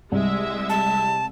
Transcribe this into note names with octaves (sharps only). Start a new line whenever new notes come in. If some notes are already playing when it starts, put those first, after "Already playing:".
C2 G#3 E5
A5